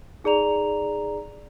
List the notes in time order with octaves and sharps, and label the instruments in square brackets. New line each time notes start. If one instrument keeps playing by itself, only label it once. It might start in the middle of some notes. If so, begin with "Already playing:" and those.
[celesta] D#4 G#4 D5 A#5 F7